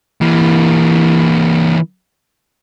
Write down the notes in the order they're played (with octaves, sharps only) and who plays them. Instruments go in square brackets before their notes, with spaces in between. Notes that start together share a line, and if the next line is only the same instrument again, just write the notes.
[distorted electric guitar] E3 A#3